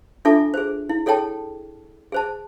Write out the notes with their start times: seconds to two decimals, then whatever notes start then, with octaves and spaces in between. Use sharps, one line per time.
0.25 D4 F4 A4 E5 A5 D6
0.54 G#4 C5
0.89 E4
1.06 G#4 A4 C#5 G5 A5
2.12 G#4 C5 A5